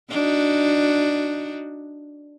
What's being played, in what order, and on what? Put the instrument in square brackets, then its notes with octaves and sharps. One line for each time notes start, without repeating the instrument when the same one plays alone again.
[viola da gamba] D4 D#4 F#4